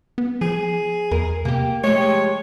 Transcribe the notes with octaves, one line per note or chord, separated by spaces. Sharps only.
B3
F3 G#4
E2 A#4
C3 A#3 G4
F3 G#3 A3 G4 C#5